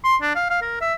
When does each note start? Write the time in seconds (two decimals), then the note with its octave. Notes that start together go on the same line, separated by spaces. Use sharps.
0.04 C6
0.21 D4
0.35 F5
0.50 F5
0.62 A#4
0.81 E5